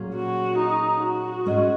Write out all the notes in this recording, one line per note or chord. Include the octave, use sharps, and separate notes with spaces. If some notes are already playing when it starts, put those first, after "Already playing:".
Already playing: A#2 F#3 C#4 G#4
F#4
D#4
F#4
G#2 G#3 C#4 G#4 D#5